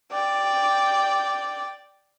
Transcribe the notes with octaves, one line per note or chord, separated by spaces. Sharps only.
D5 G5